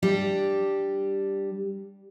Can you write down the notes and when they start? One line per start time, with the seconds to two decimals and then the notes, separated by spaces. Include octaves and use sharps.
0.03 G3 D4 G4